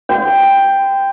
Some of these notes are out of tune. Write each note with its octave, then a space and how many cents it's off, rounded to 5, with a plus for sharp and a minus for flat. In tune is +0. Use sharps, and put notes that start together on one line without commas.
G5 +5 C6 -35